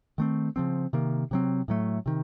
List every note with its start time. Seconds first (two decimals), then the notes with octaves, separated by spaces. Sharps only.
0.18 D#3 A3 C4
0.56 C#3 F3 C4
0.93 C3 D#3 A#3
1.31 C3 F#3 C4
1.68 A2 F#3 A3
2.06 C3 D#3